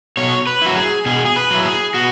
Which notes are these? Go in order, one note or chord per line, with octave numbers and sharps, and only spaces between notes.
B2 C#5
B4
F#3 E4 F#4
G#4
B2 G#4
G#4
B4
F#3 E4
G#4
B2 F#4